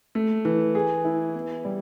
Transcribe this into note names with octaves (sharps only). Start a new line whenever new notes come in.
A3
E3
G#4
E4
B3
G3